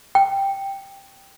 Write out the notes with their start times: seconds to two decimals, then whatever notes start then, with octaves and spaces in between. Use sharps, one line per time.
0.15 G5